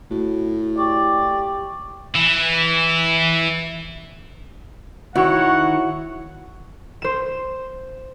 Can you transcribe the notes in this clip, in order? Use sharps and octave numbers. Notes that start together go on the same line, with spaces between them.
A2 F#4
G4 D5 C#6
E3
D#3 E4 F#4 C#5 F#5
C5 E7